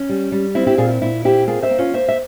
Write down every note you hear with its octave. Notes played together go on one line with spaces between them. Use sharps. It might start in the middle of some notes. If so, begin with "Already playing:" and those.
Already playing: C#4
G3
G3
C4 E4
E4 G4
A#2 F4 G#4
E4
A#2 E4
C4 E4 G4
A#3 F4 G#4
C5 E5
A#3
C#4 F4
A#3 C5 E5
E5